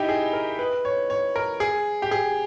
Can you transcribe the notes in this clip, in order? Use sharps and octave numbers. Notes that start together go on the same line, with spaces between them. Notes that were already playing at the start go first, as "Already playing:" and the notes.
Already playing: D#4 E4 G4
G#4
A#4
B4
C#5
C#5
A#4
G#4
G4
G#4